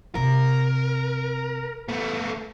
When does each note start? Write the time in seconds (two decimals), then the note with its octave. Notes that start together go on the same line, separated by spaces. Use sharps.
0.15 C3 A#4
1.88 A3 B3